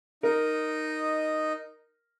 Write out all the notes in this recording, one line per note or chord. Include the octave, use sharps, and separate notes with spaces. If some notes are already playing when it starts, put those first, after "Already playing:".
D#4 A#4 D#5